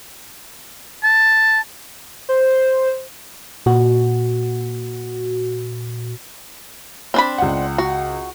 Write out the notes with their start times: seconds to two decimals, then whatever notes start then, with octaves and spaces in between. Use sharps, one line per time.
1.04 A5
2.29 C5
3.66 A#2 F#4
7.14 C4 D4 B5
7.38 C#2 F#5
7.78 F#4